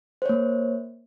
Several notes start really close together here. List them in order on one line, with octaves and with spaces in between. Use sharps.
C5 C#5 A#3